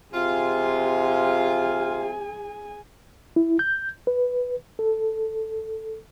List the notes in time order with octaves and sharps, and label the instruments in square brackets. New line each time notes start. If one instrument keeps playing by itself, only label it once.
[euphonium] C3 [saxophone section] F4 [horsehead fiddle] G#4 G#5
[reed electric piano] E4
G6
B4
A4